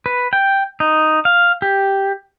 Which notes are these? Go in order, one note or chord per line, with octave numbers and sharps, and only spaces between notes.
B4
G5
D#4
F5
G4